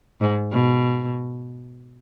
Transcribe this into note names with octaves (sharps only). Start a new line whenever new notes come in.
G#2
B2